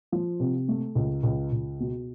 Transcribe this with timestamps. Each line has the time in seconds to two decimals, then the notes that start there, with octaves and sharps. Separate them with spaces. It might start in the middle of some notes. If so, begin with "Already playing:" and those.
0.12 F3
0.40 C3
0.68 A3
0.95 C#2
1.23 C#2
1.52 C#2
1.80 B2